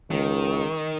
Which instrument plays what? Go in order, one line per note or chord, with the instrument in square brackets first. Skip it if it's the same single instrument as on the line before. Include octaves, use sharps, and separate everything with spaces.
[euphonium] C#2 [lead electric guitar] D#3